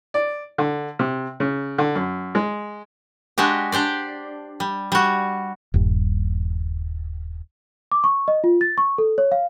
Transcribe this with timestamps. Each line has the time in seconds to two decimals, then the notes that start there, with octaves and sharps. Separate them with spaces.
0.14 D5
0.58 D3
0.99 C3
1.40 C#3
1.78 D3
1.95 F#2
2.35 G#3
3.38 G#3 D4 F#4 G4
3.72 D4 G4 C5 D5
4.60 G3
4.92 G3 F#4
5.74 D#1 G2
7.92 D6
8.04 C#6
8.28 D#5
8.44 F4
8.61 A6
8.78 C#6
8.98 A4
9.18 C#5
9.32 F5